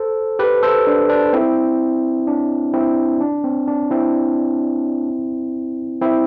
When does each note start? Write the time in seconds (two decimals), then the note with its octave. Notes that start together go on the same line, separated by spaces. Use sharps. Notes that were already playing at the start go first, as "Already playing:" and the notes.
Already playing: A4 C5
0.39 G4 B4
0.63 A4 C5
0.87 D4
1.10 D4
1.33 C4 E4
2.27 D4
2.73 C4 E4
3.21 D4
3.44 C4
3.68 D4
3.91 C4 E4
6.01 C4 E4